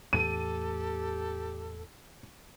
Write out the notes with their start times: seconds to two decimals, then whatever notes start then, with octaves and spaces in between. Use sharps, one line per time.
0.13 E2 A2 A3 G4 A4 D#7